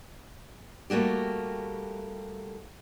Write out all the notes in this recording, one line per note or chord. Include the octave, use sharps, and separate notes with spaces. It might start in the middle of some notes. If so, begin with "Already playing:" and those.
G3 A3 A#3 F#4 G4